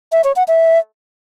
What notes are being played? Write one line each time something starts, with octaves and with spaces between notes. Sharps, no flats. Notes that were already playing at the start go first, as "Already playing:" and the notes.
E5
C#5
F#5
E5